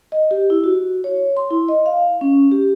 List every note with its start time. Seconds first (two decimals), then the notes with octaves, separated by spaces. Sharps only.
0.12 D#5
0.31 G4
0.50 E4
0.64 F#4
1.04 C#5
1.37 C6
1.51 E4
1.69 D#5
1.86 F5
2.21 C#4
2.51 G4